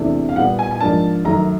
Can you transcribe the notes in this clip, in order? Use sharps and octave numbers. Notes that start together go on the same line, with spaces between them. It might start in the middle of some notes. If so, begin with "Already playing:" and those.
Already playing: E2 C3 E3 A3 D4
F5
A#2 G3 B3 F#5
G#5
G#5
G#2 F3 A#3 D4 A5
F#2 D#3 F#3 A3 A#5